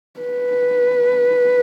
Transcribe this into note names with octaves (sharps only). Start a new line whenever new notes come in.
B4